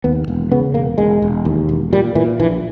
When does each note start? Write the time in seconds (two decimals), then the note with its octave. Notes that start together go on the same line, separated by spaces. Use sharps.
0.04 D#2 B3
0.28 E1
0.52 C#3 B3
0.74 E1 A#3
0.98 E1 G#3
1.22 E1
1.45 D#2
1.69 E1
1.93 A#2 G3
2.15 A#2 E3
2.40 A#1 E3